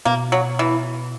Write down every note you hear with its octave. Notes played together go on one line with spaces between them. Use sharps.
B2 A#3
F#3
E3